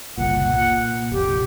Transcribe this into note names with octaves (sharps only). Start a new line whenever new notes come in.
F#1 C2 A#2 F#5
A#2
F1 A#1 G4